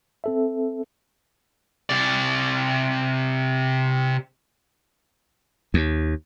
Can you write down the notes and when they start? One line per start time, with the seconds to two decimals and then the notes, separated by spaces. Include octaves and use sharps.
0.24 C4 A4 E5
1.89 C3 D5
5.74 D#2